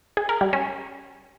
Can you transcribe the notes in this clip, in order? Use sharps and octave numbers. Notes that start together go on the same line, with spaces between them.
G#4
A#4
G3
C#4